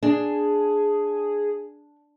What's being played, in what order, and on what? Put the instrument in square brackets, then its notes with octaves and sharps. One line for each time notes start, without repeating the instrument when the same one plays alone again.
[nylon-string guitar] D4 [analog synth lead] G#4